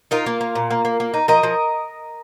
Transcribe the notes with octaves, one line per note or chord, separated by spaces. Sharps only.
D#4 F4 A#4
A#3
A#3
A#2
A#3
A#3
A#3
D#4
F3 A#4 D#5
F3